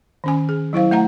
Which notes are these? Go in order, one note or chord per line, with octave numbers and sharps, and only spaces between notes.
D#3 C#4 G#5
G#4
F#3 E4 C5 F5
A3 E5 F#5 A#5